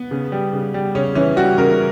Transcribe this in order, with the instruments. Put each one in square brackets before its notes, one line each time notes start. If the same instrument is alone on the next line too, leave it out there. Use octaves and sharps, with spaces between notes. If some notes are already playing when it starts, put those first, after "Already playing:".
Already playing: [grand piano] B3
C#3
G3
C#3
G3
C#3 C#4
E3 C#4
G3 F#4
C#3 A#4